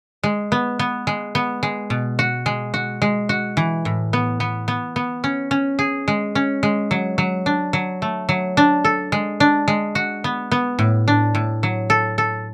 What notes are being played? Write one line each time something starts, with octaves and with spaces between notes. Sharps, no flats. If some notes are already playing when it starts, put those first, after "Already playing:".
G#3
B3
B3
G#3
B3
G#3
B2
F#4
G#3
F#4
G#3
F#4
E3
A2
B3
B3
B3
B3
C#4
C#4
G#4
G#3
C#4
G#3
F#3
F#3
D4
F#3
A3
F#3
D4
A4
G#3
D4
G#3
F#4
B3
B3
A2
D4
A2
F#3
A4
A4